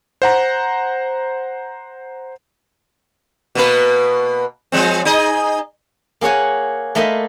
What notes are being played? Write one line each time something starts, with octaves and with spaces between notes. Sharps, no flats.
C5 F#5 A#5
B2 A#3 B4
F3 G#3 C4
D#4 G#4 D#5
A#3 G#4 C#5 F#5 G#5
A3 A#3 D#5 B5 C6